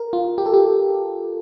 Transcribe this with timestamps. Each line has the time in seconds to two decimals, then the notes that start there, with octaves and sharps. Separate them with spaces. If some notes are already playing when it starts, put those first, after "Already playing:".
Already playing: A#4
0.13 F4
0.38 G4
0.46 A4
0.54 G4